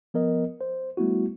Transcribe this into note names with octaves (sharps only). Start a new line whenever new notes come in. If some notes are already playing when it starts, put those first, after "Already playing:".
F3 B3 A#4 D#5
C5
G3 A3 B3 E4 F#4